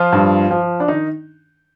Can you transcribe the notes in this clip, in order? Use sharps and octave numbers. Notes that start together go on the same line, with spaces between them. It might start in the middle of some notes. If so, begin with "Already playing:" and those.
Already playing: F3 F4
G2
F3
D4
D#3 D#4